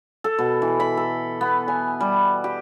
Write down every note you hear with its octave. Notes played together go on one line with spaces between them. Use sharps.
A4
B2
E3
B5
A4
B3
G#5
G3
G4